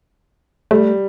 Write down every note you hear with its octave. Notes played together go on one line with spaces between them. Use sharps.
G3 A3